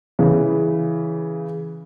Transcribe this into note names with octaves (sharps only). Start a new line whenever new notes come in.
C#3 E3